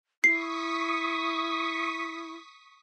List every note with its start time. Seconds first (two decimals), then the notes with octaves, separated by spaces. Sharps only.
0.24 E4 C#6 D#6 B6 C7